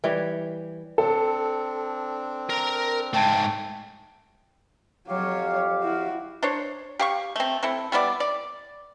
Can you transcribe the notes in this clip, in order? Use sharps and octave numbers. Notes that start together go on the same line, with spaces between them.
E3 G3 C#5
C4 D4 A4
A#4 A#5
G#2 A3 G5 A5 D7
F2 F#3 G4 C#5 F5
E4 F#4
D4 C5 C#5
G4 F5 C#6
A3 C4
C4 E4 A4
G3 B3 E4 D5
D5